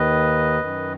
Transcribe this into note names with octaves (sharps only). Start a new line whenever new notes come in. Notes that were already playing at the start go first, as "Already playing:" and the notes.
Already playing: D#2 D#3 B4 D#5
F#2 D#3